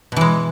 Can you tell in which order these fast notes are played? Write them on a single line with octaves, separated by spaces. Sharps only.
B2 E3 G#3